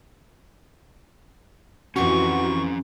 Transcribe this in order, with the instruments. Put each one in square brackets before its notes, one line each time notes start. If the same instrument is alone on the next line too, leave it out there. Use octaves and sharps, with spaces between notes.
[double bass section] F2 E3 [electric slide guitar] C#4 G4 B4 [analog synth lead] F#4 [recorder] C#6